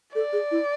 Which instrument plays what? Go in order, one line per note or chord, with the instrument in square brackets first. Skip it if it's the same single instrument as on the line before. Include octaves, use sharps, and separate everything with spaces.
[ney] A4 [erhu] D5
[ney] G#4
E4